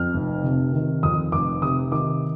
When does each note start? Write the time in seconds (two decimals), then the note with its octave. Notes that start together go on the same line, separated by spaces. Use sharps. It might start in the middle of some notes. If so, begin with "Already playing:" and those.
Already playing: F2 F6
0.14 F1
0.44 C3
0.73 D#3
1.03 F2 D#6
1.32 F1 D6
1.62 C3 D#6
1.92 D#3 D6